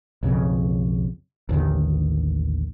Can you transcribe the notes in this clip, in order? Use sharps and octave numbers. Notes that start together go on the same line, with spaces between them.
B1 F2 C#3
A1 D#2 D3 D#3